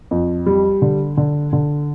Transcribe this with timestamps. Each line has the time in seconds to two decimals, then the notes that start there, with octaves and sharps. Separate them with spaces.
0.11 F2
0.46 G3
0.82 D3
1.17 D3
1.53 D3